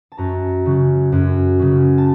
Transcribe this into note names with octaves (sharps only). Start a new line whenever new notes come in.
A5
F#2 A#5
C#3 F#3
F#2
C#3 F#3
A5